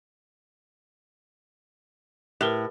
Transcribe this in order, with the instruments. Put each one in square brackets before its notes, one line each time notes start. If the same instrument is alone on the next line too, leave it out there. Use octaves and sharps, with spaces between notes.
[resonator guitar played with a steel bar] A2 [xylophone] G4 A#4 B4